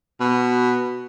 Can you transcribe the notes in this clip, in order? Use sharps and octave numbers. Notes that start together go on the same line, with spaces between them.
B2